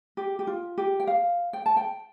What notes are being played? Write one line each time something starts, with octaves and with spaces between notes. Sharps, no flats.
G4
G4
F4
G4
G5
F5
G5
A5
G5